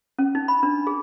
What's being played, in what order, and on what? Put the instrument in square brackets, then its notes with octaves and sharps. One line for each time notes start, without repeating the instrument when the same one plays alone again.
[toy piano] C#4
D#4
B5
D4
G#4